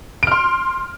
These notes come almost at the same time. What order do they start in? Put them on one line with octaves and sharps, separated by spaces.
D7 F6 C6